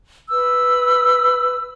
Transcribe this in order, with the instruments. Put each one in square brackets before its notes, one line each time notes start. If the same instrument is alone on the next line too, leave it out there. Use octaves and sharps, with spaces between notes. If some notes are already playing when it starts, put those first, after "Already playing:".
[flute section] B4 E6